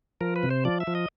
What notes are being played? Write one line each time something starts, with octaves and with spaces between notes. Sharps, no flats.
F3 A#4
B4
C3
C5
F3 D5
E5
F3
D#5